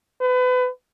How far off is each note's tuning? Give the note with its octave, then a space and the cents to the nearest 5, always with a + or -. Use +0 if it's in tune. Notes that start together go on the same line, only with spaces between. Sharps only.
B4 +30